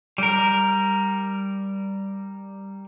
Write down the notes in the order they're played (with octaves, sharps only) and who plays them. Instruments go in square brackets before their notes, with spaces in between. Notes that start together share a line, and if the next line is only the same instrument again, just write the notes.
[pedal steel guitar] G3 A#4